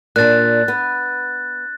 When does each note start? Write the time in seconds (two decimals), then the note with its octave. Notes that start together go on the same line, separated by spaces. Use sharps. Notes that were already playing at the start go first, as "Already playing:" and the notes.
0.16 A#2 D4 F#6 A6
0.68 B3